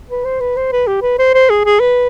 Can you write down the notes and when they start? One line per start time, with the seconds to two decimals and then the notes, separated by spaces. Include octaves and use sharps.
0.09 B4
0.25 C5
0.40 B4
0.56 C5
0.72 B4
0.87 G4
1.02 B4
1.19 C5
1.34 C5
1.50 G#4
1.65 G#4
1.80 B4